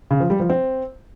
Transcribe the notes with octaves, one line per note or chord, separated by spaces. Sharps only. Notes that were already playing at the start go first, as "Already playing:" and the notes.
C#3
F3
G3
F3
C4